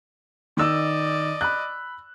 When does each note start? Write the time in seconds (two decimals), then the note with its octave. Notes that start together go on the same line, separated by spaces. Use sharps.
0.57 D#3 D5 D#5 E6
1.41 B5 F#6